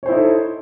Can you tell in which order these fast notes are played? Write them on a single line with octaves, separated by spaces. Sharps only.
C#5 C5 E4 D#4 A4